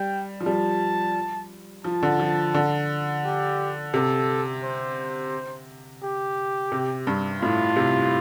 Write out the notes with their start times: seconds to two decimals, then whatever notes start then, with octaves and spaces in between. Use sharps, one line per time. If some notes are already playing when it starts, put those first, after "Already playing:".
Already playing: G3 G5
0.41 F3
0.46 G3 A5
1.84 F3 A5
2.03 D3
2.20 F3
2.54 D3
3.24 G4
3.94 C3 A4
4.64 C5
6.03 G4
6.72 C3
7.07 G2
7.42 A2 F4
7.76 C3